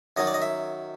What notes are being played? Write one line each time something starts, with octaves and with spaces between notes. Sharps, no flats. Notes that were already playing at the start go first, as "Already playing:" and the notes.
F#2 D#3 F#3 D#5
D5
D#5
E5